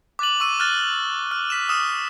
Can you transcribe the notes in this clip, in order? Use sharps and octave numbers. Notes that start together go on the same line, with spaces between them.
D6 F#6 A6 D#7 F#7
C#6 E6 D#7
F6 F#6 A6 G7
F6
F6 B6 E7
D#6 F6 E7